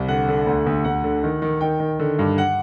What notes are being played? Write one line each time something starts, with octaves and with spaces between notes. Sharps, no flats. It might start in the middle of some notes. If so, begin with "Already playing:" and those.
Already playing: C2
D3 F#5
D3
D2
D2
D2 F#5
D3
D#3
D#3
D#3 G5
D#3
D3
G2
F#5